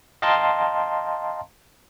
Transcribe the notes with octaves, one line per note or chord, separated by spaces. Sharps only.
D#5 F5 G5 A5 A#5 C6